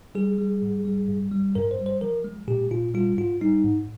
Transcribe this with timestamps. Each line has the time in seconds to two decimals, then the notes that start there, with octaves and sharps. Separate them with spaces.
0.15 G3 G#4
0.38 G3
0.62 G#2
0.85 G3
1.08 G2
1.32 G3
1.55 G2 A#4
1.71 C5
1.79 G3
1.86 C5
2.01 F3 A#4
2.24 G#3
2.48 A#2 G4
2.71 A#2 F4
2.94 G3 F4
3.18 G#2 F4
3.41 G3 D#4
3.64 G#2